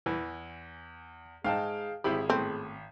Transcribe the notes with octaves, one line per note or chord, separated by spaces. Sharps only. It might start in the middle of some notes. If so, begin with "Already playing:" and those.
E2 E3
G#2 D#4 G#4 F5 G5 A5
G#1 C4 E4 G4 G#4 B5
A2 A3 B3 C4 G#4